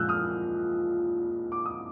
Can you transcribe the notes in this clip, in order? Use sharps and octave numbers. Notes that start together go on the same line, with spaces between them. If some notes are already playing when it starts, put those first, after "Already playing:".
Already playing: A#2 F3 G#3 E6 F#6 G6
D#6 F6
D6
D#6